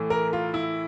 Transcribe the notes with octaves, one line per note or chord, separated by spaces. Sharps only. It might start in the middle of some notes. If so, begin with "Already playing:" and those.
Already playing: A2 E3 A3
A#4
F4
E4